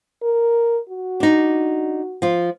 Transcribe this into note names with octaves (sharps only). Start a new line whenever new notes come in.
A#4
F#4
D4 D#4
F3 F4